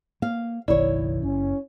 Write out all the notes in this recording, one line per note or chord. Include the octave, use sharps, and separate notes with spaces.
A#3 F5
F#1 B1 D#3 E4 C#5 D5
F#1 C#4